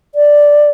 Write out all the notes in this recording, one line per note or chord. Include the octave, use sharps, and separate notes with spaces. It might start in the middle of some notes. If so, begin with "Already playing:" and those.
D5